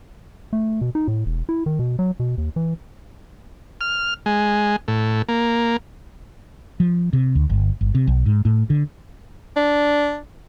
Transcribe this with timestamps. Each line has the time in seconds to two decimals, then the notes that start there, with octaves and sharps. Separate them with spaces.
0.53 A3
0.81 B2
0.95 D#4
1.08 A2
1.26 E1
1.49 E4
1.66 D#3
1.79 B2
1.99 F#3
2.20 B2
2.38 D#2
2.56 E3
3.81 F6
4.26 G#3
4.88 A2
5.28 A#3
6.80 F3
7.13 C3
7.35 D2
7.50 G1
7.81 G1
7.95 C3
8.07 B1
8.26 G#2
8.45 A2
8.70 D3
9.56 D4